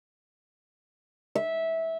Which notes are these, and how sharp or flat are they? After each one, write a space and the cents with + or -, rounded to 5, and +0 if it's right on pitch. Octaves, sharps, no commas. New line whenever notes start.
E5 -15